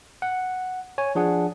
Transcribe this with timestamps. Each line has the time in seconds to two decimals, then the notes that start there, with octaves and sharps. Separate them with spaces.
0.22 F#5
0.98 C#5 G#5
1.15 F3 D4 G#4 F#5